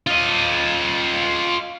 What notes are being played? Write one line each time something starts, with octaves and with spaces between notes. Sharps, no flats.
F4 D#5